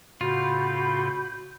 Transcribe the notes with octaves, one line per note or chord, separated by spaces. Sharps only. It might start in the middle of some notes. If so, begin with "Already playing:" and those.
A2 C#3 F4 F#4 B5 G6